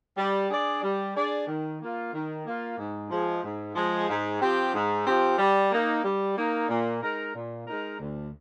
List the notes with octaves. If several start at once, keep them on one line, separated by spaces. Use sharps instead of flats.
G3
D4 G#4 D5
G3
D4 G#4 D5
D#3
A#3 F4
D#3
A#3 F4
G#2
F3 G#3
G#2
F3 G#3
G#2
F3 C4 G4
G#2
F3 C4 G4
G3
A#3 D#4
G3
A#3 D#4
A#2
G#3 D#4 A#4
A#2
G#3 D#4 A#4
D2